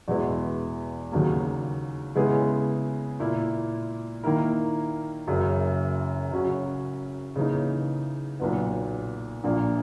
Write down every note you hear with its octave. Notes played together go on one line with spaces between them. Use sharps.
E2 B2 G#3 B3 E4
D#2 C#3 F#3 A#3
C#3 G#3 B3 E4 G#4
A#2 A#3 E4
D#3 A#3 E4 A#4
F#1 F#2 C#3
C#3 F#3 C#4 F#4
C#3 E3 A#3 D#4
B1 A#2 F#3 B3
A#1 A#2 A#3